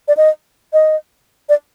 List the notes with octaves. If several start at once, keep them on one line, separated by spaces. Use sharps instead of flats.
D5
D#5
D#5
D5